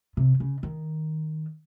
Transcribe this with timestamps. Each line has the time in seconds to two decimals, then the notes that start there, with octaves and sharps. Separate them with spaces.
0.17 C3
0.40 C#3
0.63 D#3